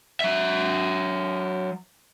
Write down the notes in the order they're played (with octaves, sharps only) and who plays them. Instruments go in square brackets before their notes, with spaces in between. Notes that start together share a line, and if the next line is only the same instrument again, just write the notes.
[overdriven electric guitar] F#3 E5